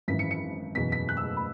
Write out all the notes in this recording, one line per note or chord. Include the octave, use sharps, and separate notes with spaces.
G#1 F#2 E3 B6
C#7
C#7
F#1 E2 B2 B3 B6
B6
F#6
E6
B5